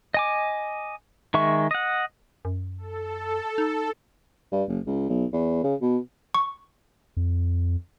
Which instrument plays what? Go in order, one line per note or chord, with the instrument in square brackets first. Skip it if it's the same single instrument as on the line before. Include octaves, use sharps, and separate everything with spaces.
[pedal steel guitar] D#5 G#5 D6
D#3 G#3 E5 C#6
D#5 F#5
[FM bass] F#2
[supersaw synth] A4
[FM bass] D#4
[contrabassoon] G2
F#1
C#2
B1
E2
C#3
B2
[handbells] C#6
[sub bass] F2